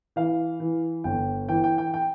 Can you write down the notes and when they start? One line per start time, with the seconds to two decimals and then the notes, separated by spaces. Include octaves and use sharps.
0.16 E3 F5
0.60 E3
1.04 G1 G5
1.48 E3 G5
1.64 G5
1.78 G5
1.94 G5